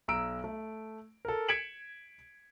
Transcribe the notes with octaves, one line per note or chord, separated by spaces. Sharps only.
B1 A#5 E6 D7
A3
A4 A#4
G#6 B6 C#7 D7 E7 F#7